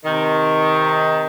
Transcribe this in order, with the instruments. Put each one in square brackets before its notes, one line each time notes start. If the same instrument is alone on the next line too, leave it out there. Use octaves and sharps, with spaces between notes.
[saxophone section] C3 D#3